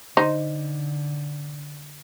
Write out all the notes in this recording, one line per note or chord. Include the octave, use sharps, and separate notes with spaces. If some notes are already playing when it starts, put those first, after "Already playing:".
D3 D#4 C5